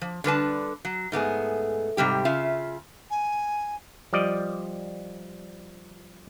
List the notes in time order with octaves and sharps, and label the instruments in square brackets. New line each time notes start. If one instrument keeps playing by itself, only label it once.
[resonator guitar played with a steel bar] F3
D3 G3 B4 A5
F#3
G#2 A3 B3 G#4
G#2 C3 G3 G4
C#3 F4 E5
[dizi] G#5
[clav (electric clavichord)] F3 G3 D5 D#5